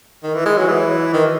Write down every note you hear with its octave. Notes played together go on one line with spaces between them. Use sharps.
D#3
E3
G#3
F#3
E3
D#3